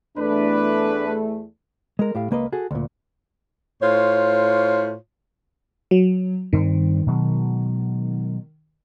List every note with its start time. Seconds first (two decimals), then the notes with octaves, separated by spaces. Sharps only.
0.18 E2 A3 D4 B4
1.99 G#3 A#4
2.15 A2 G4 F5
2.31 C#2 A#3 B4 D#5
2.53 F#4 G#4 A4
2.71 D2 A#2
3.82 A2 F4 C5 C#5
5.91 F#3
6.53 G2 D#3 C4
7.07 B2 F#3 G#3